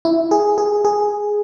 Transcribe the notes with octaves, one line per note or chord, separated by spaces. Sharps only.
E4
G#4
G#4
G#4